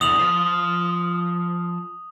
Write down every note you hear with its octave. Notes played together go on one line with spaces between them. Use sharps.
E2 D3 D#6 F7 F#7
F3 C5